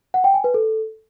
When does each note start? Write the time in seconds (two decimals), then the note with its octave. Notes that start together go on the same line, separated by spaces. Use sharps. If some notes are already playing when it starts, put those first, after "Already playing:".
0.14 F#5
0.24 G5
0.34 G#5
0.44 B4
0.54 A4